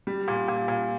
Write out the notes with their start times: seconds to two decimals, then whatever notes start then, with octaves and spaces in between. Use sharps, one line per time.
0.07 G3
0.28 A#2
0.48 A#2
0.68 A#2